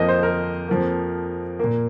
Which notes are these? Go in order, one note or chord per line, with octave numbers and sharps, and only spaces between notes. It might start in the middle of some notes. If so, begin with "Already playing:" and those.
Already playing: F2 F3 A#3 D#5
C5
A#4
F2 F3 A#3
A#2 A#3